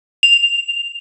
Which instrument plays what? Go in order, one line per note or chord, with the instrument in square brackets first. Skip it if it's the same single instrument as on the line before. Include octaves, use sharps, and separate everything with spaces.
[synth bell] F7